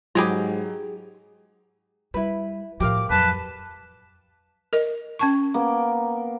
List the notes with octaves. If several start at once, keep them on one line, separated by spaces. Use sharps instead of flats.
G#2 F#3 F4 G4 G#4 A#5 B5
G3 E4 B4
A2 F3 G4 A#4 F5 D6
F2 F#3 B4 A5
A#4 D#5
C#4 A5 C#6
A#3 B3